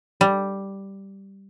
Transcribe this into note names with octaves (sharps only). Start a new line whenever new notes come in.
G3